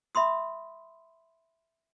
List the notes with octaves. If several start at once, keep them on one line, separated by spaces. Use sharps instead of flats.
E5 B5 C6 D#6